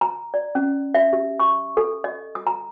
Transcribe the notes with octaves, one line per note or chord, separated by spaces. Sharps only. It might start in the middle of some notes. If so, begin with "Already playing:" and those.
A#5
D5
C#4
E5
G4
C#6
A4
D#5
D#6
A#5